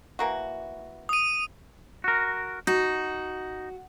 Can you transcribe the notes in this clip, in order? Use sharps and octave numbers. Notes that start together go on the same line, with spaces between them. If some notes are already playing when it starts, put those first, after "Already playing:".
E3 A#3 F#4
D#6 D#7
F#4 A#4
D#4 F#4